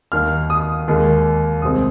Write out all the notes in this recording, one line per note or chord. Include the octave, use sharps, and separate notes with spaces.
D#2 D#3 A#3 F6
D#6
D#2 D#3 G#3
C2 C3 G#3 C4 D#6